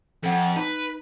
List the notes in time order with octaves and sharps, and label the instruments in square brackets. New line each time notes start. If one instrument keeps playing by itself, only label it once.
[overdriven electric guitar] F2 [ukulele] A4 F#5
[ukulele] D#4 [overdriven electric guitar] B4